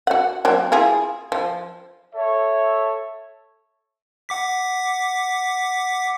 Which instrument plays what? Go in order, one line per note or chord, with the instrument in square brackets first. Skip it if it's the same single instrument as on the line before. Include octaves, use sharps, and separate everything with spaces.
[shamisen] F#4 F#5
F#3 A#3 C4
E4 F4 G#4
F3
[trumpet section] A4 C#5 E5
[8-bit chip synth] F#5 D6 B6